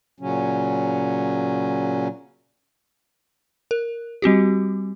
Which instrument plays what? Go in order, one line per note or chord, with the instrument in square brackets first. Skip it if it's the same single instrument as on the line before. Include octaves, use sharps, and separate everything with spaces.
[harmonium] A#2 C#3 F#3 C#4
[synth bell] A#4
G3 C4 F#4 G4